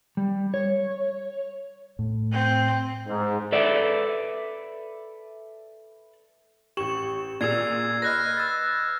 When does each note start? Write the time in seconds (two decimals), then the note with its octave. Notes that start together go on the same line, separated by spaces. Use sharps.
0.17 G3
0.54 C#5
1.99 A2
2.32 C4
3.07 G#2
3.52 A4 B4 D5 E5
6.77 A1 G4 C#6 E7 F#7
7.41 A#2 G#4 D5 E6 G#6 C7 F7
8.02 B4 D#5 F6 F#6 A#6
8.37 E6 A6